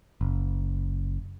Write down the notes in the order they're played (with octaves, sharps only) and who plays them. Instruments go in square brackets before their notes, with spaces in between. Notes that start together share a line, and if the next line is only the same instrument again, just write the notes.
[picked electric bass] F#1